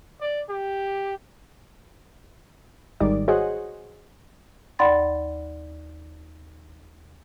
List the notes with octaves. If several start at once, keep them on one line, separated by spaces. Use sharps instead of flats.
D5
G4
G#1 D#3 G3 D#4 D5 D6
F#4 G#4 C5 C#5 D#5 F#5
D#2 D5 F#5 B5 C6 A6